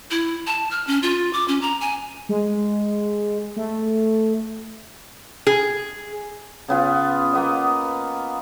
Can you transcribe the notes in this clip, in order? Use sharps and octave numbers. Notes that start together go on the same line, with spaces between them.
E4
A5
F6
C#4
F4
D6
C#4
A#5
G#5
G#3
A3
G#4
C#3 B3 F4
A#3 B3 D#5